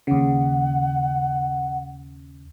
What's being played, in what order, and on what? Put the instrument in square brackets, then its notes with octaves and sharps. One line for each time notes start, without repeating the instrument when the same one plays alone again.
[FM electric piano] D#2 C#3 [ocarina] F#5